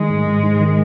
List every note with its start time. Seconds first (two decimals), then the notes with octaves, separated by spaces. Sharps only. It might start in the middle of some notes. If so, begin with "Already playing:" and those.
Already playing: D#3 G#3
0.10 G#2
0.27 G#2
0.43 G#2
0.60 D#3